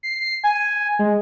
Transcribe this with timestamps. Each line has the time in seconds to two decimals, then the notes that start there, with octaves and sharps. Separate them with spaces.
0.03 C7
0.44 G#5
0.99 G#3